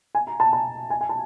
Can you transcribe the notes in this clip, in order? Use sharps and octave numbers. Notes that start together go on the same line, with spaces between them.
G#5
A#5
A5
A5
G#5
G#5
A5